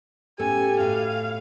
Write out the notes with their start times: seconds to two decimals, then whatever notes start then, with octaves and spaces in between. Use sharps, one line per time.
0.39 A2 B3 C#4 G4 A4 G#5
0.80 A2 F#4 F5